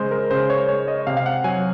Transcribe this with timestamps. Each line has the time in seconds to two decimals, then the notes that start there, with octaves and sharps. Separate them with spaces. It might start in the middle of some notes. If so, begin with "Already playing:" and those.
Already playing: C#3 G#3 C5
0.11 A#4
0.31 C#3 C5
0.50 C#5
0.68 G#3 C#5
0.88 D#5
1.07 C3 F5
1.17 F5
1.26 F#5
1.44 F#3 G#5